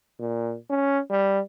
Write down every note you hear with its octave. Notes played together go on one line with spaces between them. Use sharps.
A#2
C#4
G3